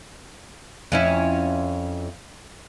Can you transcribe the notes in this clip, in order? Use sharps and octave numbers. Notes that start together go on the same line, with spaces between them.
F2 C#4 E4